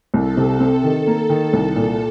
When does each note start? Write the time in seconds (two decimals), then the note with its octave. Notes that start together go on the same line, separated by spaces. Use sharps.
0.14 C2 A4
0.37 C3
0.60 C4
0.83 D#3
1.07 A#3
1.30 D#3
1.53 C2
1.76 A#2